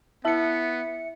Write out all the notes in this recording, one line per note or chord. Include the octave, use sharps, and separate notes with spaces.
B3 E4 E5 A5 C#7